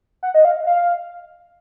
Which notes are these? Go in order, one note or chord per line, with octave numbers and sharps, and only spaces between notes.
F#5
D#5
F5
F5